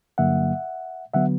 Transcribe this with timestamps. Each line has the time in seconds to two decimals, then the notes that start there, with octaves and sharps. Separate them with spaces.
0.18 G2 D3 F#3 A#3 E5 F#5
1.14 D3 F#3 B3 E5 F#5